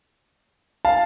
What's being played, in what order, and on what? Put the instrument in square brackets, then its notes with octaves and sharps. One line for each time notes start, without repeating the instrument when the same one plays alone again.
[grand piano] F5 A5